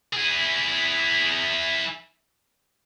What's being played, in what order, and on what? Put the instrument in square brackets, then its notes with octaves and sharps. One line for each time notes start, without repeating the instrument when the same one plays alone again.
[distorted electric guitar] E4 G#4